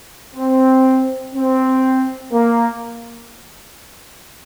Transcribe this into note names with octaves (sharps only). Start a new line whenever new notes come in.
C4
C4
A#3